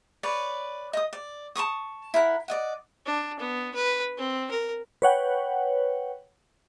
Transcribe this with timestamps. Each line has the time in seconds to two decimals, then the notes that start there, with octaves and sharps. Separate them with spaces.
0.23 B4 C#5 D5
0.93 D#5 D#6
1.13 D5
1.55 A5 C6 C#6 D#6
2.14 E4 A#4 F#5
2.48 D5 D#5 F#5
3.06 D4
3.40 B3
3.75 B4
4.18 C4
4.51 A#4
5.02 B4 C#5 F#5 G5